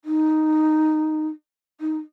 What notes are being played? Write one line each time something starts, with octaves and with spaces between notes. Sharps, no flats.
D#4
D#4